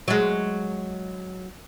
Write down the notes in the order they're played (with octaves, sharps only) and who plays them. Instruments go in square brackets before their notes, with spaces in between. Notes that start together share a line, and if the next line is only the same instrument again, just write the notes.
[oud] F#3 G#3